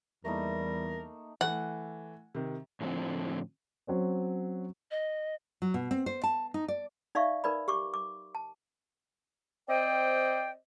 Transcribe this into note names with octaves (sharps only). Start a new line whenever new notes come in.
E2 G3 A3 A#3 D#4 A#4
E3 A3 F#5
C3 D#3
A2 D3 F3 C4
F#3 C4 C#4
D#5
F#3
B2
C4
C5
A5
D#4
D5
D#4 D5 E5 F5 C#6
D#4 A#4 B4 D5 B5
G4 C#6 D6
D6
A5
C4 C5 D5 D#5 G5